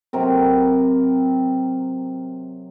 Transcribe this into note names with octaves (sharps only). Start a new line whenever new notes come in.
C3 F#3 C4 A#4